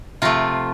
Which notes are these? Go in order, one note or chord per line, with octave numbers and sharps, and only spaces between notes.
C3 F3 A3 F4